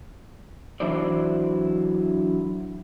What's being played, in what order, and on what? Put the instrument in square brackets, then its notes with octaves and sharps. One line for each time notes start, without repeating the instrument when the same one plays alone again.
[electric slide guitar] E3 F#3 D4 E4 C5 D5